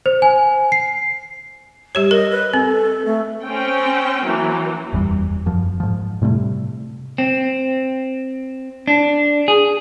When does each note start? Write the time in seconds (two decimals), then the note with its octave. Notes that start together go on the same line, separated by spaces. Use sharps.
0.06 C5
0.22 G#5
0.72 C7
1.95 G3 G4 C#5
2.11 A#4 D#5
2.31 B4
2.54 C4 A4
3.06 A3
3.44 C4 C#4 G5
4.25 E3 F#3 A#3
4.93 F#1 E2 G#2 G3
5.46 F#2 F3
5.80 G#2 F3
6.22 A2 C3 G3 A3
7.18 C4
8.88 D4
9.48 G#4